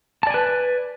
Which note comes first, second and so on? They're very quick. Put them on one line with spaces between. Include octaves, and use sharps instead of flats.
A5 D5 G#5 B4